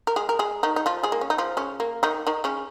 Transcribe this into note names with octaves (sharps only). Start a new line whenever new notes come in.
A#4
G#3 G#4
A#4
G#3 G#4
D#3 D#4
D#4
F3 F4
G#3 G#4
A#3
C#4
D#4
F3 F4
C#3 C#4
A#3
D#3 D#4
D#3 D#4
C#3 C#4